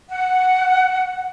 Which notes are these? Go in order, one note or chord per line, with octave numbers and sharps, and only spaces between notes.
F#5